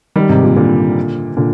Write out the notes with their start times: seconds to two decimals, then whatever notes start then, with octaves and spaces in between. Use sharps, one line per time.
0.16 D#3 G3
0.29 G#2 C3
0.43 A#2
0.57 A#2 D3
1.37 A#2 D3